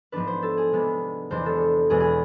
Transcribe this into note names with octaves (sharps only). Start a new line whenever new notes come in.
G#2 F3 B3 D4 B4
C5
A4
G#4
C3 G#3 B3 D4
E2 C3 G#3 D4 C5
A4
E2 B2 G#3 G#4
G#4